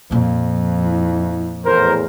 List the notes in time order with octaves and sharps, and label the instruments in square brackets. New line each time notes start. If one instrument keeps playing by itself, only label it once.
[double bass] F2 [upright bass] A#2 F3
[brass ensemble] E4
[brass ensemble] E2 A2 [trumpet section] A#4 C5